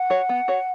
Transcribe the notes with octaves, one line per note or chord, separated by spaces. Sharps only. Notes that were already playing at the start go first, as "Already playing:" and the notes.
Already playing: F#5
F#4 C#5
B3
F#4 C#5